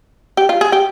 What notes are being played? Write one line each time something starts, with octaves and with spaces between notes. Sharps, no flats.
G4
F4
G#4
G4